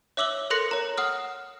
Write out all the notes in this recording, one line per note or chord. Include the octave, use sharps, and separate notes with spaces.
C#5 E5 D6 E6 F#7 G7
A4 A#4 C6 F#6 A#6 C#7
C#5 A#5
F#5 D#6 F6